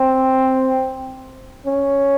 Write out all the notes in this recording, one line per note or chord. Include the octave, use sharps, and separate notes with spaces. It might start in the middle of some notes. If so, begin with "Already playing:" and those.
Already playing: C4
C#4